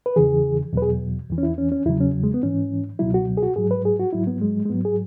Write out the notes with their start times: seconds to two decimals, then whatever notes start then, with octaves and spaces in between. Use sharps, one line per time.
0.06 B4
0.16 E2 C#3 E3 G#4
0.73 E2 B2 F#3 B4
0.82 G#4
1.29 E2 E3
1.38 C#4
1.43 E4
1.58 C#4
1.72 C#4
1.86 E2 C#3 F#3 E4
2.00 C#4
2.23 G#3
2.34 B3
2.43 G#2 E3 C#4
2.99 C#2 B2 F#3 E4
3.14 F#4
3.37 G#4
3.43 F#4
3.56 G#2 F#3 G#4
3.71 B4
3.85 G#4
3.99 F#4
4.13 G#2 F#3 E4
4.27 B3
4.41 G#3
4.65 G#3
4.70 G#2 F#3 B3
4.85 G#4